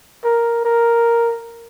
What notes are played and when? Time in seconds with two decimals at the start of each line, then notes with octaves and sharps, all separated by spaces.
0.24 A#4
0.65 A#4